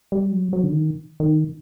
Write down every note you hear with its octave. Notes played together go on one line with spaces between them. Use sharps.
G3
F#3
F#3
D3
D#3
D#3